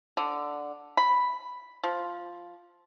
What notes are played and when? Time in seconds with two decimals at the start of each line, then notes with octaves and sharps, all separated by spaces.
0.17 D3
0.97 B5
1.83 F3